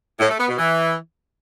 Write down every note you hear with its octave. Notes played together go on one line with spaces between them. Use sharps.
A2
A3
B3
B2
E3